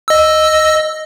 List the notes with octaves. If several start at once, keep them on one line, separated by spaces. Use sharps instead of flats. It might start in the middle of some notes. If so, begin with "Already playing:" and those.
D#5 E6